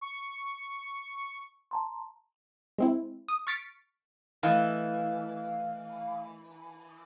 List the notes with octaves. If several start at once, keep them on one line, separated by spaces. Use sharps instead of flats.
C#6
A5 A#5 C6
G#3 C4 E4
D#6
C#6 F6 A6 B6 C#7 D7
E3 A3 E4 D#5 F5